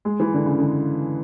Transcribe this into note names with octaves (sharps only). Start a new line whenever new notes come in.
G#3
E3
D3
C#3
D3